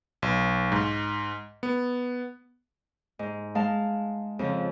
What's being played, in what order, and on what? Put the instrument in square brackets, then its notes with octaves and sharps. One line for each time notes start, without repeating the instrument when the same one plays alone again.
[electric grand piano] B1
G#2
B3
[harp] G#2
G#3 F5 A5
F2 C#3 F3